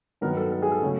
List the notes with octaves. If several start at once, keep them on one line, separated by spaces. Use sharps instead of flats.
G2 D#3 F#3 B3 D#4 A#4
A4
A4
G#4
A4
C#3 F#3 A3